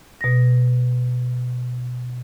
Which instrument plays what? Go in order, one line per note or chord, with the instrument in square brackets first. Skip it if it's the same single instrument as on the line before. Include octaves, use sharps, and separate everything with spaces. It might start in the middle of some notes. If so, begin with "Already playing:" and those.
[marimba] B2 A#6